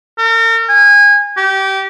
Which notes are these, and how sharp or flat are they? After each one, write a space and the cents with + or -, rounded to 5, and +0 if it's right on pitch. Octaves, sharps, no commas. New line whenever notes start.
A#4 -40
G#5 -25
G4 -25